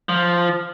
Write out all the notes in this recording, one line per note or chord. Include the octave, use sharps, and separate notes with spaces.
F3